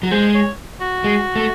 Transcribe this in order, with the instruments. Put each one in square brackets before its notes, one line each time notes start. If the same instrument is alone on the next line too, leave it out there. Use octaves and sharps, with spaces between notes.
[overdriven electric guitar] F#3
[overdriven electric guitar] G#3 [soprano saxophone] C5
[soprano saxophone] C#5
F#4
[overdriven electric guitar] G#3
A3